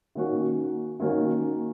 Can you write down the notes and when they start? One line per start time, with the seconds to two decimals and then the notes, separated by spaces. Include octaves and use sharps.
0.15 D#3 A#3 C#4 F#4
1.00 D#3 A#3 C#4 F#4